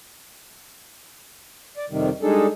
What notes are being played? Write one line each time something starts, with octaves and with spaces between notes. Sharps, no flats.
D5
F2 C3 D#3 G3
G3 G#3 D4 D#4 G#4 A4